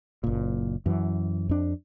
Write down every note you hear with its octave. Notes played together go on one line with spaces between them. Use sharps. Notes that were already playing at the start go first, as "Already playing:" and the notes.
F#1 A#2
F#2 E3
F2 D4